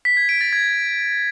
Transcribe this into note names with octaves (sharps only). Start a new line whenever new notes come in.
B6
G#6
D7
A6
G#6